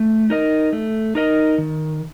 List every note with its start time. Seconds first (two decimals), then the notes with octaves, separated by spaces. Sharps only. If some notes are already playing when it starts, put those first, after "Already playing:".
Already playing: A3
0.30 D#4 A#4 D#5
0.73 A3
1.15 D#4 A#4 D#5
1.58 D#3